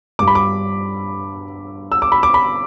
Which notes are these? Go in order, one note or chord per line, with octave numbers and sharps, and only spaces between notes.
G2 G3 D6
B5
D6
E6
D6
B5
D6
B5